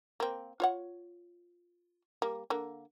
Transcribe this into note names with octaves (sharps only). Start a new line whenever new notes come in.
A#3 C4
F4 C#5 F#5
G3 A#3
D3 A#3